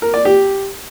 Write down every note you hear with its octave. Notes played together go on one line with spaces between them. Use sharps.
A#4
D5
G4